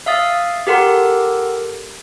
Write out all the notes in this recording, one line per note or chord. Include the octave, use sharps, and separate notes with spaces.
E5 F5 D#6 A6
G4 A4 A#4 F#5 C6